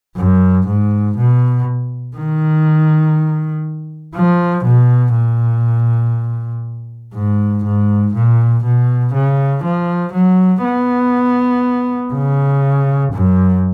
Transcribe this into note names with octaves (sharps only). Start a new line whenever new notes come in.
F#2
G#2
B2
D#3
F3
B2
A#2
G#2
G#2
A#2
B2
C#3
F3
F#3
B3
C#3
F#2